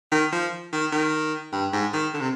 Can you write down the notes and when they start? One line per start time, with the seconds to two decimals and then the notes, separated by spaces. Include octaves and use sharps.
0.12 D#3
0.32 F3
0.72 D#3
0.92 D#3
1.52 G2
1.73 G#2
1.93 D#3
2.14 D3
2.21 C3